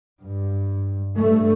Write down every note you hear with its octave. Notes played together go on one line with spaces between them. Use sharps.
G2
G2 A3